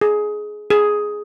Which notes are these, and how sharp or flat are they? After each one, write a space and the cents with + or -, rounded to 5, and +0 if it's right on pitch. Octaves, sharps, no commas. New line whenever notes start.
G#4 +15
G#4 +5